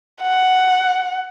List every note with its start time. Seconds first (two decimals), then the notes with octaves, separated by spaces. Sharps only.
0.22 F#5